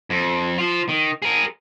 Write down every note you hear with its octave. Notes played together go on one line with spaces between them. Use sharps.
F2
F3 F4
D#3
G#4 A#4